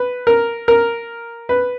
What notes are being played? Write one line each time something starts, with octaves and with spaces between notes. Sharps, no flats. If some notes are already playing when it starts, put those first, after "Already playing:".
Already playing: B4
A#4
A#4
B4